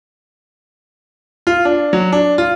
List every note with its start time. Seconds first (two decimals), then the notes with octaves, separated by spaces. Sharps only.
1.47 F4
1.65 D4
1.93 F#3
2.12 D4
2.38 F4